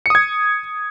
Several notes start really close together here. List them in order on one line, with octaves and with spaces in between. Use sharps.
C#7 D#6 G#6